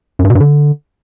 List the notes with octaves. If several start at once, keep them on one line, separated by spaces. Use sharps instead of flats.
F#2
G2
B2
G2
D3